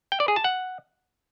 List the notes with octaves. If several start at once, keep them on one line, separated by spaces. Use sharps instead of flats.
G5
D5
G#4
A5
F#5